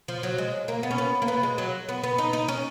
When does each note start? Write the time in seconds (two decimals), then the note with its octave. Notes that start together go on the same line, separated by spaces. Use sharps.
0.08 F3
0.23 F#3
0.38 G#3
0.68 A#3
0.83 B3
0.91 C#4
0.98 B3
1.22 A#3
1.28 B3
1.43 G#3
1.58 F#3
1.89 B3
2.03 B3
2.18 D#4
2.33 D#4
2.48 C#4